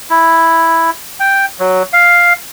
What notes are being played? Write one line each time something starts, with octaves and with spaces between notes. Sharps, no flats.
E4
G5
F#3
F5